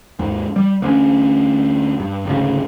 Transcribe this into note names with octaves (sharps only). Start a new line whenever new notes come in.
D#2 G#2
G3
D2 B3 C#4
G2
G#1 D2 C#3